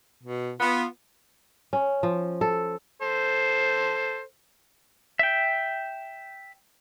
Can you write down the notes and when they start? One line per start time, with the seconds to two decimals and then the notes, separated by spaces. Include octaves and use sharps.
0.23 B2
0.60 B3 F4
1.73 C#4
2.03 F3
2.41 A4
3.02 A4 C5
5.19 E5 G5